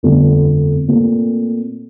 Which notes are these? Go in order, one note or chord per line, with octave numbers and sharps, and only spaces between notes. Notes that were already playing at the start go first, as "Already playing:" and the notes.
G1 F2 D3 A3 D4
A#2 A3 C4